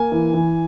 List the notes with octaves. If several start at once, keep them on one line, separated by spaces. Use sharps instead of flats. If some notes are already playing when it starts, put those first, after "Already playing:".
Already playing: A#3 G#5
E3
E3